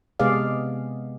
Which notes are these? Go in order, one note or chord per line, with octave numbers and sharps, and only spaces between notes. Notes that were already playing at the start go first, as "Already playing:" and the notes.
C3 G#3 B3 G#4 D5 F5